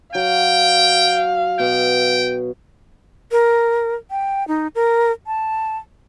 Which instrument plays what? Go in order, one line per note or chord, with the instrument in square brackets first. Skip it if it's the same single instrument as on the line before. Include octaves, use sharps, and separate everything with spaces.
[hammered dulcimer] F#3 [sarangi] F5 [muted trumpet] G5
[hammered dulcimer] B2 [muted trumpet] G5
[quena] A#4
G5
D#4
A#4
A5